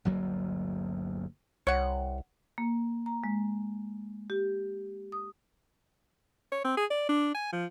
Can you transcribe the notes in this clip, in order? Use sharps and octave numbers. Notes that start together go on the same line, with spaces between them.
G1 D2 F#3 A#3
C2 C#5 F#5
A#3
A#5
G#3
G4
D#6
C#5
C4
G#4
D5
D4
G#5
F3